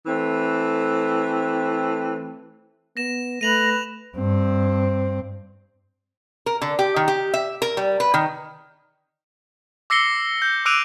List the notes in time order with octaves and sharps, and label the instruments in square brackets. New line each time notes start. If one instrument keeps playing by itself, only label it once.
[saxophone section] E3 A3 C4
[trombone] B3 [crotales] A#6 E7
[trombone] A3 [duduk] B4 [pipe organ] A#6 [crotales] D#7 F7 F#7
[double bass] G2 C4
[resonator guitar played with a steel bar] A#4
D3
G4
D#3
G4
E5
A#4
G3
B4
D#3
[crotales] D6 E6 A#6 C7 C#7 G7
G6
D6 E6 F#6 D7 D#7 F7